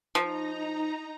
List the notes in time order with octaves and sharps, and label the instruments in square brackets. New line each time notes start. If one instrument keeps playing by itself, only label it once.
[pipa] F3 [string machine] D#4 A#5